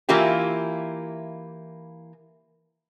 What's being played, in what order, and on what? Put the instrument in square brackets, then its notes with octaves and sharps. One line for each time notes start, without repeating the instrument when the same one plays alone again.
[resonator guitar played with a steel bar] E3 A#3 E4 F4 G4